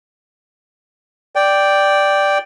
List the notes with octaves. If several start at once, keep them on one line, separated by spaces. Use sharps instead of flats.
D5 G5